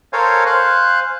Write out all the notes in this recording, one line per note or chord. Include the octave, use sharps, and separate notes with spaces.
A4 A#4 C5 C#5 F5 G#5
C5 F5 G#5 F#6